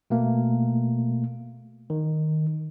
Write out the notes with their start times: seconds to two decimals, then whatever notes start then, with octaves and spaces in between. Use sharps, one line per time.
0.10 B2 A3 A#3
1.90 D#3